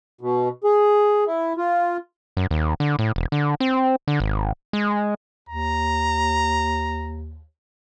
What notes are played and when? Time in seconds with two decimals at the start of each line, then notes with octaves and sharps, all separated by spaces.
0.21 B2
0.64 G#4
1.27 E4
1.57 F4
2.37 F#2
2.51 D#2
2.80 D3
2.99 A2
3.16 E1
3.32 D3
3.60 C4
4.08 D3
4.20 G#1
4.73 G#3
5.49 D#2 A#5